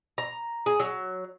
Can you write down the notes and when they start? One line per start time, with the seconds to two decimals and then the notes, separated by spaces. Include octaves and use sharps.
0.18 A#5
0.66 G#4
0.80 F#3